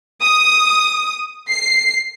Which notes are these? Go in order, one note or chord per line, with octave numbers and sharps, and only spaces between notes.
D#6
C7